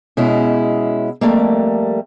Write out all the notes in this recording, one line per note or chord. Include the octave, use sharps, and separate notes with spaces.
B2 G#3 C#4 E4
F2 C#3 G3 A3 A#3